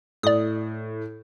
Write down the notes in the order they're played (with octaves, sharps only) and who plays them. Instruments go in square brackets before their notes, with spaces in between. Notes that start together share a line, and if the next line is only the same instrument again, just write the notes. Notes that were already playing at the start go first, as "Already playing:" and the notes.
[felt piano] A2 [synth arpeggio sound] D5 D#6